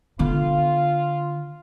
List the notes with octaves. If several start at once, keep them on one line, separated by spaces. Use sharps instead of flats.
D3 B3 F4